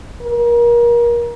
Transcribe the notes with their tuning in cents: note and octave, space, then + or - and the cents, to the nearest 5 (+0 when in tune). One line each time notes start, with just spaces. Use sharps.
A#4 +30